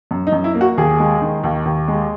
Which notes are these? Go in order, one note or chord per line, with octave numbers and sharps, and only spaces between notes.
F#2
D#4
F#2
E4
A#3
F#4
D#2 G#4
G#3
D#3
D#2
D#2
G#3